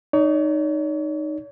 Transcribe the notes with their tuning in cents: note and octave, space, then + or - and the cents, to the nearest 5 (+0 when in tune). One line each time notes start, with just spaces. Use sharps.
D#4 -15 C#5 +40